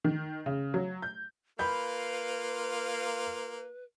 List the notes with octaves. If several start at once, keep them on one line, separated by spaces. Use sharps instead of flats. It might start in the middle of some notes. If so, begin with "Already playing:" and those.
D#3
C#3
F#3
G6
A#3 F4 B4 B5 G6